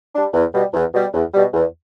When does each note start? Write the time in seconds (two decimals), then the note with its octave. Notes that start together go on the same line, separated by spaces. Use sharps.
0.14 G3 D4
0.33 E2
0.54 B2 G3
0.73 E2
0.94 B2 G3
1.13 E2
1.34 B2 G3
1.53 E2